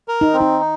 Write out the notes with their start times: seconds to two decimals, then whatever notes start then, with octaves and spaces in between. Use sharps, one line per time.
0.08 A#4
0.21 D#4
0.33 C4
0.40 D#4
0.60 D#4